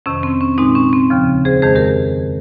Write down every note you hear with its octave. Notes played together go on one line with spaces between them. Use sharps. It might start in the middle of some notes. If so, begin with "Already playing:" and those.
F2 C3 D#3 C#4
C4
C#4
A#2 G#3 C4 D#4
C#4
C4
D#2 C#3 F3
G#4 C5
F2 D#3 G#3 G#4 C5
G4 A#4